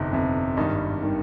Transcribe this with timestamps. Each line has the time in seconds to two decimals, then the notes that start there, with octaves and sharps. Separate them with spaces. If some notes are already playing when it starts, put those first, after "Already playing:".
Already playing: G1 F2 C3 D#4
0.12 G1 F2 C3
0.57 G#1 G2 D#3 G3 D#4
1.02 D#3 G3